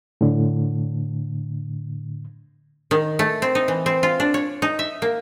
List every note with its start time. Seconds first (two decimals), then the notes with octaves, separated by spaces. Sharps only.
0.21 A2 D3
2.91 D#3
3.19 A3
3.42 C4
3.55 D#4
3.68 E3
3.86 C4
4.03 F4
4.20 D4
4.34 C#5
4.62 D#4
4.79 E5
5.02 A#3